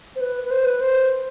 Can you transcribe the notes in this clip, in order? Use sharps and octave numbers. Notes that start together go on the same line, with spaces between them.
C5
B4
B4
C5
B4
C5